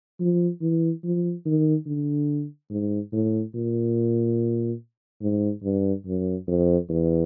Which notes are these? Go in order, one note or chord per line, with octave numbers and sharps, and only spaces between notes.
F3
E3
F3
D#3
D3
G#2
A2
A#2
G#2
G2
F#2
F2
E2